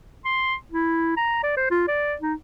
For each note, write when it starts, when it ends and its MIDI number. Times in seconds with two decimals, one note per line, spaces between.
0.25 0.55 84
0.72 1.15 64
1.17 1.39 82
1.43 1.52 74
1.57 1.69 72
1.71 1.84 65
1.88 2.15 74
2.22 2.34 63